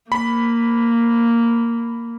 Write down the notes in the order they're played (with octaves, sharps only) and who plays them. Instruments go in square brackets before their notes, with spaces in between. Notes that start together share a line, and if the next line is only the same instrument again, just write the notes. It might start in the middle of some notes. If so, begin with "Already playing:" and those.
[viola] A#3 [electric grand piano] B5